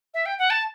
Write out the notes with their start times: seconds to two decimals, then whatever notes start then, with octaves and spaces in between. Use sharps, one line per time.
0.14 E5
0.26 G5
0.38 F#5
0.50 A5